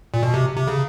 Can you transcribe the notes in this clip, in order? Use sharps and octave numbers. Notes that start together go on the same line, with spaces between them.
A#2
B2
C3
C3
C#3